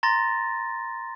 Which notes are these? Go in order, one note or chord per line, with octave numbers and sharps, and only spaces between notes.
A#5 C6 A6 A#6